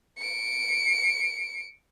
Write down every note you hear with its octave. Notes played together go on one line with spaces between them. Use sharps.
C#7 D7